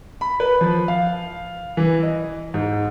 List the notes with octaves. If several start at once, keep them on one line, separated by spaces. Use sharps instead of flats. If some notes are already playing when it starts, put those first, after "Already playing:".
B5
B4
F3
F5
E3
D#5
G#2